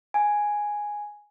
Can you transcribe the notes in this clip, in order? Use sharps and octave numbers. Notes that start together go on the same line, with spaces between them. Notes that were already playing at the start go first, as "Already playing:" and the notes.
G#5